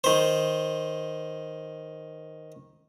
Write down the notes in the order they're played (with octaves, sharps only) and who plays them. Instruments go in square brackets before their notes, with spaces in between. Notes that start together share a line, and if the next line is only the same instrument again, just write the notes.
[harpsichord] D#3 C5